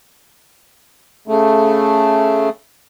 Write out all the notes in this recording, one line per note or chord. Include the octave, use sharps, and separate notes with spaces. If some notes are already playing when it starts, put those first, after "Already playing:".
C#3 A3